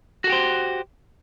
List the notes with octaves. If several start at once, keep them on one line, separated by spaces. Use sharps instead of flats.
F#4 G4 A4 C5